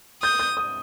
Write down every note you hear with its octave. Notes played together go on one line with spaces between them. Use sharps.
D#6 G6
G6
D#6